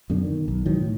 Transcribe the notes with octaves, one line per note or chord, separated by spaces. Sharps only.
F#2 B2 D3
D#3
B1
G#2 D#3 E3 F#3
A2